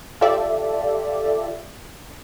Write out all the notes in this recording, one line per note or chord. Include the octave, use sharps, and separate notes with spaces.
F4 G4 A4 D5 E5